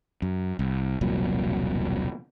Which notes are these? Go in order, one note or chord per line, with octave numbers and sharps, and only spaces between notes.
F#2
C2
E1 C2 A#2 F#3